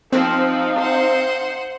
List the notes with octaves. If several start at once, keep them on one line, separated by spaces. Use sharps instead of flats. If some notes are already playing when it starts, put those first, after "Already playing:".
F3 C4 D#4 F5
C5 F#5